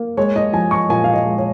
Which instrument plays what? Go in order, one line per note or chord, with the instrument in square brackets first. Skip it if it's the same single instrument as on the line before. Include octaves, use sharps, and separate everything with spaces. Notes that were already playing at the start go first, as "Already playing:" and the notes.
Already playing: [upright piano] A#3
G#3 C#5
D#5
F3 G#5
C#6
A#2 G#5
F5
D#5
G#3
C#5